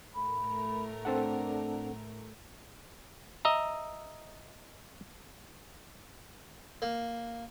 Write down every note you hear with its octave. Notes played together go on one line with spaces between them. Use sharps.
A2 A3 A#4 B5
C4 D4 A4 F#5
D#5 E5 A#5
A#3